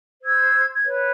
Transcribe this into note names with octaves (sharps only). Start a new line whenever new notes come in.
C5 E6 G#6
G#6
B4 C#5